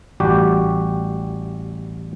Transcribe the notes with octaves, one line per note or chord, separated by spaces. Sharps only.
A1 G3 F#4 G4